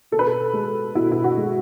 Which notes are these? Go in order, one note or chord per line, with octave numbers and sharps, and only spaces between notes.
B2 A4
B4
A4
G#3
B2 E4
E4
F#4
G#3